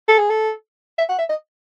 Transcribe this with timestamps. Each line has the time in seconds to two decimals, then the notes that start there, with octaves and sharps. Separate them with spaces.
0.09 A4
0.19 G#4
0.30 A4
0.98 E5
1.09 F#5
1.19 E5
1.29 D#5